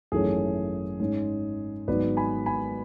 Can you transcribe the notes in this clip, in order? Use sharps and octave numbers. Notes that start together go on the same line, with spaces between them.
G#1 F#2 E3 A3 C#4 G#4
G#2 G#3 C#4
G#1 G#2 F#3 B3 B4 D5
G#5 B5
G#5 B5